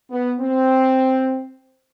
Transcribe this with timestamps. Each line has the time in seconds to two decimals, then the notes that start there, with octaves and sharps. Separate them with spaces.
0.10 B3
0.40 C4